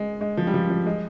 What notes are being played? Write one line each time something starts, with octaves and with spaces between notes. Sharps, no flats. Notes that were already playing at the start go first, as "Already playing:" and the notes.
Already playing: G#3
G#3
F3
G3
F3
F3
G#3